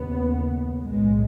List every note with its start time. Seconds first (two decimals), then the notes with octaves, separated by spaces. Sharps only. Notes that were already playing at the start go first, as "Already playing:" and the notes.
Already playing: D#2 C#3 B3
0.85 B1 A2 G#3